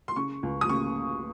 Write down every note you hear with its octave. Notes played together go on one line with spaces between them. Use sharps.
C6
C#3 C#6
C#2
D#6
C#3 C#6